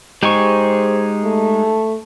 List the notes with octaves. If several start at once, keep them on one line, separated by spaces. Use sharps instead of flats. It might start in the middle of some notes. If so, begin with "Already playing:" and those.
G#3 D#4 G4 G#4 C5 C#6
A3